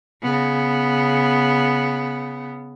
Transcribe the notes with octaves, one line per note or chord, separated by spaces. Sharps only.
C#3 B3